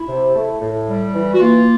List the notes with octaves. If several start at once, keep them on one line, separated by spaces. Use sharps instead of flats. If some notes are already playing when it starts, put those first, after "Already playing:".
Already playing: E4
C3
A3
A2
G3
E3
F#4
A#3 F4